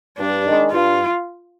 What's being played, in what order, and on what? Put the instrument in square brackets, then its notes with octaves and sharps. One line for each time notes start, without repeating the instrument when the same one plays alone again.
[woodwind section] G2 [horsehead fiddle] D4
[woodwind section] D#3 G#3
[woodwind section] G2 [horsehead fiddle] F4